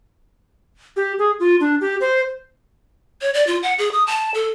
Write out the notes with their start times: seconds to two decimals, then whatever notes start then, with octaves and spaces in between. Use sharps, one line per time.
0.97 G4
1.19 G#4
1.40 F4
1.60 D4
1.81 G4
2.01 C5
3.21 C#5
3.34 D5
3.47 F4
3.62 F#5
3.78 G#4
3.92 D#6
4.07 A5
4.34 A4